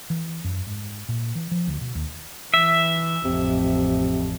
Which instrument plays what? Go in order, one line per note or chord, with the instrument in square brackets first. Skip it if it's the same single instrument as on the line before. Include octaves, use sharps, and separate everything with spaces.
[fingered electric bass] E3
F#2
G#2
A#2
E3
F3
D2
B2
D#2
[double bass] E3 [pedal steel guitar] E5
[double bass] A1 F2 [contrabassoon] C3